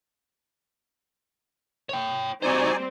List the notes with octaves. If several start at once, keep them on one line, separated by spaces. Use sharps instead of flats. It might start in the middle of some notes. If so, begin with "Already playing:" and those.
C#5 G5
G3 C4 D#4 F#4 C5 D5 G#5